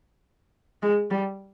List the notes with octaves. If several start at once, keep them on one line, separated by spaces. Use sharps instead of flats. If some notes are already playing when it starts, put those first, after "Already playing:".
G#3
G3